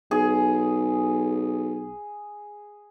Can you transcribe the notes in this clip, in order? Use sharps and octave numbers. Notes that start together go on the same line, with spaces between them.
B1 G#4